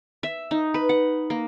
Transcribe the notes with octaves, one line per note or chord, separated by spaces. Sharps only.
E5
D#4
B4
F#5
A#3